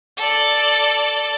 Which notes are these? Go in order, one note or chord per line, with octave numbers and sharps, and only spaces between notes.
A4 D5